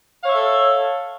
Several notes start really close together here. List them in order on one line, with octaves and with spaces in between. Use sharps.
F5 C#5 E5 A4